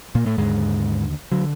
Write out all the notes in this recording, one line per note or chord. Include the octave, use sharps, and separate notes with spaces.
A#2 A#3
A2 A3
D#2 G#2 D3 G#3
D3 F#3